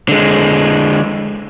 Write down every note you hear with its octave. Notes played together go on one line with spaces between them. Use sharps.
D3 G#3